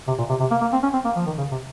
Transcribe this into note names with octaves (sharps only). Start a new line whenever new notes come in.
C3
A#2
C3
C3
A#3
A#3
C4
C#4
C4
A#3
F3
D#3
C#3
C3